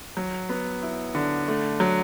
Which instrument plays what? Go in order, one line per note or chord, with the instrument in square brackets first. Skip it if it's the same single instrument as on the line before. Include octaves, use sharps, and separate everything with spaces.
[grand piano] F#3
B3
E4
D3
A3
F#3